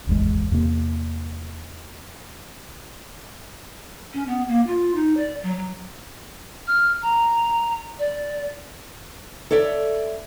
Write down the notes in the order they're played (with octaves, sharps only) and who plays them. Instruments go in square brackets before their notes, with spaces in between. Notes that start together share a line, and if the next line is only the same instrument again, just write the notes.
[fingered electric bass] D1 G#1 E2 G#3
E2 C3 A#3
[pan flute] C#4
B3
A#3
F4
D#4
D5
F#3
F#3
F6
A#5
D5
[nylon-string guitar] A4 C#5 D5 E5